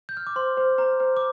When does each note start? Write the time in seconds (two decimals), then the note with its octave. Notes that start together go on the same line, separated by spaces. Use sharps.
0.09 G6
0.17 F6
0.27 D6
0.36 C5 C6
0.57 C5
0.78 C5 A#5
1.00 C5
1.17 D6